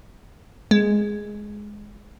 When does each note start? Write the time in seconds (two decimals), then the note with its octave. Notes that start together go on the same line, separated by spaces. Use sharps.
0.71 G#3